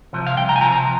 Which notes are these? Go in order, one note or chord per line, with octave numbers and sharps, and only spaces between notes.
C3 F3
F5
C2 G5
A#5
G#5
C3 F3 A#5
A#5